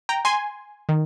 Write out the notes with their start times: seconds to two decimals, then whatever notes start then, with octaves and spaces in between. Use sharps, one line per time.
0.09 G5 A#5
0.25 G#5 C6
0.89 D#3